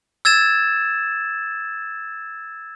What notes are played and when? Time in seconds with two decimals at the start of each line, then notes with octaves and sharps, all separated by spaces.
0.25 E6 G#6 A6 E7